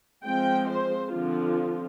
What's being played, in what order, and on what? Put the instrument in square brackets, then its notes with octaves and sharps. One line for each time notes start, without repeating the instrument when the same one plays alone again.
[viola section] F3 G#3 C4 G5
C5
D3 F3 C4 F4